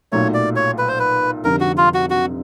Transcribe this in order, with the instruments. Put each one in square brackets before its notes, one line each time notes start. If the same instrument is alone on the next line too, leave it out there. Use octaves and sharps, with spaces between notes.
[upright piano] B1 A#2 F#3 A3 [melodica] C#5
[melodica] D5
C#5
B4
C5
B4
[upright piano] F1 F2 D3 G3 [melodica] A#4
[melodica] F#4
F4
F#4
F#4